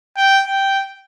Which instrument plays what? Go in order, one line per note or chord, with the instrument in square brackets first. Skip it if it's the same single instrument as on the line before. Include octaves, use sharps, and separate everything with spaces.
[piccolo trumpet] G5
G5